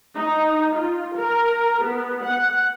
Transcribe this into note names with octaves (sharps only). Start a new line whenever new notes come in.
D#4
F4
A#4
B3
F#5